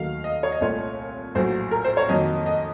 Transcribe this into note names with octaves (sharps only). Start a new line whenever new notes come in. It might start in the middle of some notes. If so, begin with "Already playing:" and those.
Already playing: D#2 D#3 F#3 A3 F5
D#5
C#5
D#5
C2 A#2 A3 C#5
A#1 A2 F#3 C5
A#4
C5
C#5
F2 D#3 F#3 A#3 D#5
D#5